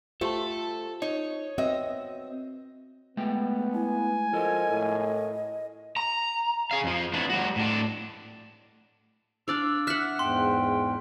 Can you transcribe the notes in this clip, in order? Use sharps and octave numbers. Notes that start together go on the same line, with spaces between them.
A3 F4 G4 A4 C5 A5
D#4 C#5
B3 C4 F#4 D#5 E5
G#3 A3 B3 G5
E4 G#5
F3 A4 A#4 D#5
A2
A#5
G#4 F5
F2 F3
B3 D4 E4
G3 F#4
A2 D4
D4 D5 F5 E6
E5 F#5 F6 F#6 B6
E2 G#2 G5 C6